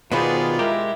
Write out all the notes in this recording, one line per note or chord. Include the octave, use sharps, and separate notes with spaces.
B2 D#3 B3 F4 G#4 B4 C5 D5
G#3 E4 G4 A#4